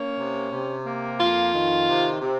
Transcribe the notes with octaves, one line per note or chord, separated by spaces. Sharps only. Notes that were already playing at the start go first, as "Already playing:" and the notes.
Already playing: A#3 C#4
C3
C3
A#3
F2 F4
D#3
C3
C3